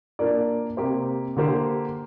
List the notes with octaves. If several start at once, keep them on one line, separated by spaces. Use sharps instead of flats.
A#2 A#3 D4 A#4 D5
C3 A#3 G4 C5
D3 A#3 G4 C5